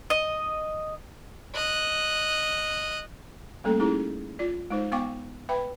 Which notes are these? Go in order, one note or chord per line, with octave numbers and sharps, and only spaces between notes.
D#5
D#5 F#6
G3 A3 A#3 C#4 A4
C#4 D#4 E4 G4 G#4
F4 D5
G#3 D#4 C5
B3 F5 G5 C#6 D6
B4 E5 G5 B5